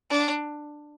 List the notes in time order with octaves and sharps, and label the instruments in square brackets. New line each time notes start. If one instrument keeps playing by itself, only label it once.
[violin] D4